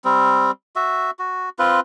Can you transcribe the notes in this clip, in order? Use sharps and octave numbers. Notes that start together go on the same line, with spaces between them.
G3 C4
F#4 E5
F#4
C4 F4 B4